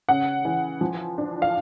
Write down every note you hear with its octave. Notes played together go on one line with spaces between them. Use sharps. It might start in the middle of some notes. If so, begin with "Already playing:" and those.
C#3 F#5
E3
F3
D4
F5